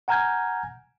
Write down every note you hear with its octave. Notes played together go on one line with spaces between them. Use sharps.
F#5 G#5 A#5 F6 G6 G#6